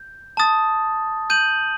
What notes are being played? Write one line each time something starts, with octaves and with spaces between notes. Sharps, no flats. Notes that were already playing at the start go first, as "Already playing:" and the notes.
Already playing: G6
A5 D#6 A6
G6 D#7 F#7